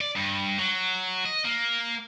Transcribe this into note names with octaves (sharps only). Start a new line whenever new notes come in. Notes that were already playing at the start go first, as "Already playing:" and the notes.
D5
G2
F#3
D#5
A#3